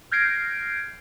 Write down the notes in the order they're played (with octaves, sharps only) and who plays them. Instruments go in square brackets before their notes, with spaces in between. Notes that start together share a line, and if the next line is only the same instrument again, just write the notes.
[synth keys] F6 G6 G#6 A#6 C7 D7